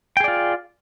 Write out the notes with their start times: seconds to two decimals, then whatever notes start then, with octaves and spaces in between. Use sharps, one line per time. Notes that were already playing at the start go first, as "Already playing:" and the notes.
0.17 G5
0.20 G#4
0.24 D5
0.28 F4